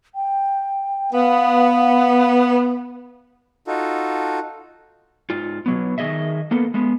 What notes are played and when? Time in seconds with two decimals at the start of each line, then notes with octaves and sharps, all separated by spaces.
0.15 G5
1.13 B3 F5
3.67 D#4 F4 F#4 A4
5.30 G#2 F4
5.66 B2 F#3 B3
5.98 D#3 E3 G#4 D#5 E5
6.51 A#3 B3 A4
6.74 G#3 B3